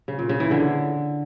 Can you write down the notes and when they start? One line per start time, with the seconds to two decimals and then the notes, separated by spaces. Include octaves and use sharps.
0.08 C#3
0.19 A#2
0.29 C#3
0.40 E3
0.51 D3